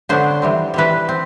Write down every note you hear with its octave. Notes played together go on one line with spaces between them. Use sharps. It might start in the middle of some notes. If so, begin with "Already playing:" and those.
D3 F#3 B3 D4 C5
E3 G3 C4
E3 G3 C4 B4
C4